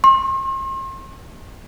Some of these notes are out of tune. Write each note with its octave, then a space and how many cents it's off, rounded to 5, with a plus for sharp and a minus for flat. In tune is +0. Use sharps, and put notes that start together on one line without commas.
C6 +40